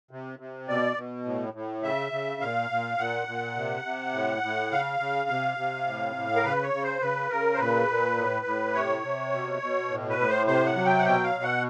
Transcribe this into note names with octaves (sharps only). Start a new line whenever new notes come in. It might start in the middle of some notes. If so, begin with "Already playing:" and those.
C3
C3
B2 D5
B2
A2
A2
C#3 E5
C#3
A#2 F5
A#2
A#2 F#5
A#2
C3
C3
A2
A2
C#3 F5
C#3
C3
C3
A2
A2
A#4
C#3 B4
C#5
C#3
C5
C#3 B4
C#3 A#4
C5
A#2 B4
A#2
A2
A2
C3 C#5
C3
B2
B2
A2
B4
A2
C5
C3 C5
F#5
F#3
G5
F#5
B2 G5
F5
B2
F#5